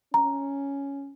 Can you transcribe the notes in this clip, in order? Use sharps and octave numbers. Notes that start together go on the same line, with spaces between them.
C#4 A#5